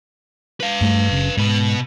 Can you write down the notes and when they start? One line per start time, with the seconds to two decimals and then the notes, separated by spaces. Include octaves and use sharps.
0.60 B4 F5
0.81 G2 A3
1.11 F#1 C#3
1.37 G#2 B2 B4